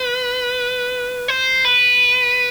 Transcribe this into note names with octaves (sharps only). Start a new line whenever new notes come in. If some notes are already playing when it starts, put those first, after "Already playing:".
Already playing: B4
C5
B4